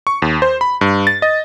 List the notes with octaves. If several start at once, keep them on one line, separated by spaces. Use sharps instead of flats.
C#6
D#2
C5
B5
G2
A6
D#5